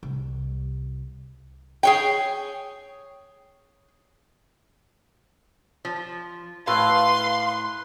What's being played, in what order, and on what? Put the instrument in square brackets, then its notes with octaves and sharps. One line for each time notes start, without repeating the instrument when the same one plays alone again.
[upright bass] C2
[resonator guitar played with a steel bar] G#4 C#5 G5
F3
[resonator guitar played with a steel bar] A2 [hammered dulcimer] B4 [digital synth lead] F5 [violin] C6